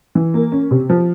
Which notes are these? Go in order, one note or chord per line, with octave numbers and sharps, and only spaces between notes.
E3
A#3
C#4
C3
F3